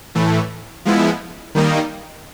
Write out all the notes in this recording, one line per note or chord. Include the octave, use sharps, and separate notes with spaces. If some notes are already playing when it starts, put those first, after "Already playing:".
A2 E3 A3
F3 G#3 B3 E4
D#3 G3 A#3 D#4